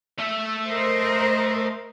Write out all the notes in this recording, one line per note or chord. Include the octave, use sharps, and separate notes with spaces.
A3 E5
A#4 C5 D#5